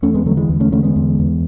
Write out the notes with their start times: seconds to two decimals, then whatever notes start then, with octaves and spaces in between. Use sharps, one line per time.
0.02 E2 A3 C#4
0.14 G#3 B3
0.26 D3 F#3 A3
0.37 E3 G#3
0.49 E2
0.60 A3 C#4
0.72 D3 A3 C#4
0.83 G#3 B3
0.96 E2
1.19 E2